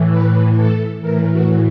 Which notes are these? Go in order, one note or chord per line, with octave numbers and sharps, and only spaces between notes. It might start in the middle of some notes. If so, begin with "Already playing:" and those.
Already playing: A2 E3
B4
A4
A2 E3 A#4
F#4